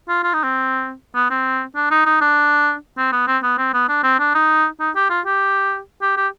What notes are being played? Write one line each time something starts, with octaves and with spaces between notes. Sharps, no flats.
F4
F4
D#4
C4
B3
C4
D4
D#4
D#4
D4
C4
B3
C4
B3
C4
B3
D4
C4
D4
D#4
D#4
G4
F4
G4
G4
G4